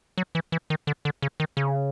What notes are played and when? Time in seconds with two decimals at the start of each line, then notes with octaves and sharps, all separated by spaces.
0.18 F#3
0.35 E3
0.52 E3
0.70 D#3
0.87 D3
1.05 D3
1.22 C#3
1.40 D#3
1.57 C#3